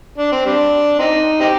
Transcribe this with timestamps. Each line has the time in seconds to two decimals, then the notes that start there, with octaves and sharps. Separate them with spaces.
0.18 D4
0.32 C4
0.46 G3 D4
0.99 C4 D#4
1.40 C4 D#4 G4